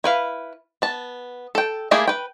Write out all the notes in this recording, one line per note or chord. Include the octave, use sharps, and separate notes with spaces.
E4 B4 F5
B3 A5
A4 G5
A3 A#3 E4 G4 G#4
B4 G5